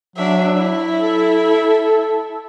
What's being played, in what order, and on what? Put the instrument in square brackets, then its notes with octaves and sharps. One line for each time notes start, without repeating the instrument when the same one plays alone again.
[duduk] F#3 [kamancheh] D4 E5
[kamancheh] E4 E5
[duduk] A4